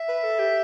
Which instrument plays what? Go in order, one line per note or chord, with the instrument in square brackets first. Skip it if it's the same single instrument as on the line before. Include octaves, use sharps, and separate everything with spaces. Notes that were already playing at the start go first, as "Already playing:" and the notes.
Already playing: [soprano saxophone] E5
[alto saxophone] B4
A4
G4